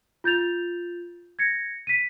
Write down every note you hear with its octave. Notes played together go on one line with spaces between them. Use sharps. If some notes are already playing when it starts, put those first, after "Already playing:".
F4 G6 A6 F7
G#6 A#6 C#7
B6 D#7